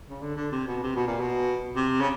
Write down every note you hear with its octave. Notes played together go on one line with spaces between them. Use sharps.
C#3
D3
D3
C3
B2
C3
B2
A#2
B2
C3
C#3